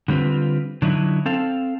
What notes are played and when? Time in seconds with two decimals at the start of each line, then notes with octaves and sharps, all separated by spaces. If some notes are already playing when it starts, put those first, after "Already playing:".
0.08 D3 G3 C4 F4 B4
0.82 D3 F#3 D#4 E4
1.26 C4 A4 F5